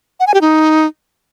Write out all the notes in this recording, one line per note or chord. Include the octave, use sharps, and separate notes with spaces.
F#5
G#5
G4
D#4